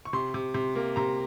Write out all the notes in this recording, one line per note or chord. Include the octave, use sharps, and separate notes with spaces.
C#6
C3 C6
C3
C3
A#3
C3 A#5